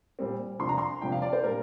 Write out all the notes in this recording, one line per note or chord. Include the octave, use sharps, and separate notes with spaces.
A#2 G3 C4
C3 F3 D4 C6
A#5
C6
C3 F3 D4 G5
F5
D5
C5
A#2 G3 D4 A#4